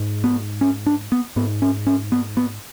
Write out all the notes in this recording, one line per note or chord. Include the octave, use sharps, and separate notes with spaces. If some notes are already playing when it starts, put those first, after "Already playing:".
Already playing: G#2
B3
C#4
D4
B3
G#2 B3
C#4
C#4
B3
B3